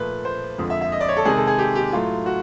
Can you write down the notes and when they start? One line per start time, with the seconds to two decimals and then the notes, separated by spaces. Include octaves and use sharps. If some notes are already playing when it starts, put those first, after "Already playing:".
Already playing: A#2 F3 A3 B4
0.25 C5
0.58 F2 D3 F3 G#3
0.70 E5
0.81 E5
0.92 D#5
1.00 D5
1.09 C#5
1.16 A4
1.25 C3 D#3 G#3 G#4
1.37 A4
1.47 G#4
1.59 G4
1.75 G4
1.93 A2 F#3 A3 F4
2.26 F#4